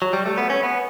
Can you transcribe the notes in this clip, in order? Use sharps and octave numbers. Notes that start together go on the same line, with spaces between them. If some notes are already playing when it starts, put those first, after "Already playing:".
F#3
G3
A3
B3
C#4
B3